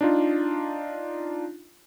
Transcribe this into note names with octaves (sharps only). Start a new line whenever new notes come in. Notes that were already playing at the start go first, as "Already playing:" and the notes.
D4 D#4 F4